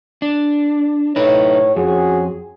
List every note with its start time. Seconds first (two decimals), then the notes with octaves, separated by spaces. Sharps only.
0.22 D4
1.16 A2 D#4 B4 C#5
1.76 F2 C#4 F#4 G#4